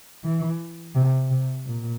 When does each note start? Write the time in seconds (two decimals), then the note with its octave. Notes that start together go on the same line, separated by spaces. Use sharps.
0.24 E3
0.95 C3
1.30 C3
1.66 A#2